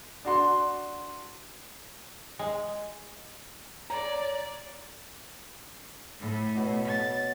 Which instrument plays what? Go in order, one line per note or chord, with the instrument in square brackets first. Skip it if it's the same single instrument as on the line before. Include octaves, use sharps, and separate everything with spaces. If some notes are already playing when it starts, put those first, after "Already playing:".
[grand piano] D4 F#4 C6
[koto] G#3
[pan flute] C#5 [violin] D5 [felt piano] A#5
[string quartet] A2
[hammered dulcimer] B2 F#4 C#5
[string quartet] A6